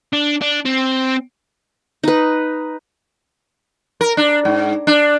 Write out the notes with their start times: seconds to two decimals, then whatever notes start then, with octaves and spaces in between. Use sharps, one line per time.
0.13 D4
0.42 D4
0.66 C4
2.04 D#4 B4
4.01 A#4
4.17 D4
4.45 G#2
4.87 D4